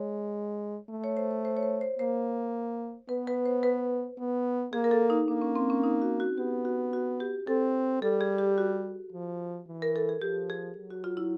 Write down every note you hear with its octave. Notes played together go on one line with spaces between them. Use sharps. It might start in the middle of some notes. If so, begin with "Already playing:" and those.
Already playing: G#3 C#5
A3
C#5
C5
C5
C5
C#5
C5
C5
A#3 C5
B3 B4
B4
C5
B4
B3
A#3 G#4
A#4
A4
D#4
A#3 D4
C#4
C4
C#4
D#4
F#4
F#4
B3 G4
F#4
F#4
G4
C4 A4
G3 A4
G#4
G4
F#4
F3
E3
A#4
A4
G#4
F3 G4
G#4
F#3
F#4
F4
E4